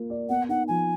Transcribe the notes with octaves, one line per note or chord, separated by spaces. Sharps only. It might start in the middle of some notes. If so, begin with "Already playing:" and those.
Already playing: A#3 F4 A#4
D5
B3 F#5
D#4 F#5
F3 G#5